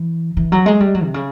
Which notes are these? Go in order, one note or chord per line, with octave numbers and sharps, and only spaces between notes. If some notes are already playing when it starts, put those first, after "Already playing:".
Already playing: E3
E3
F#3
G#3
G3
F#3
C3
C#3